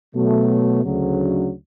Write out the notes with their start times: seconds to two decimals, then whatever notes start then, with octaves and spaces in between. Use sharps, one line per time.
0.14 B2 F#3 A3
0.83 D2 C#3 F#3